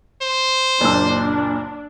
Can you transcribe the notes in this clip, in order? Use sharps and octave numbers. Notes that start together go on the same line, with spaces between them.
C5
F#1 A#2 D4 E6